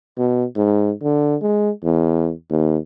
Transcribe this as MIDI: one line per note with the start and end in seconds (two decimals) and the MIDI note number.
0.18 0.45 47
0.56 0.92 44
1.02 1.36 50
1.42 1.70 56
1.83 2.32 40
2.50 2.78 39